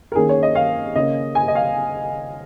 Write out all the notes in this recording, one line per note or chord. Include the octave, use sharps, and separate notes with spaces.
A#4
D#3 A#3 C#4 G#4
C#5
D#5
F5
C#3 A#3 C#4 D#5
G#5
D#5
F5